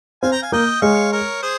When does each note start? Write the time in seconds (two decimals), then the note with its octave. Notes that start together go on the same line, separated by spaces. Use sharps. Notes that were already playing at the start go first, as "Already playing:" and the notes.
0.23 C4 F5 G#5
0.32 G5 A#5
0.42 F5 G#5
0.52 A#3 D#5 G5
0.82 G#3 C#5 F5
1.12 A#4 C#5
1.42 G#4 C5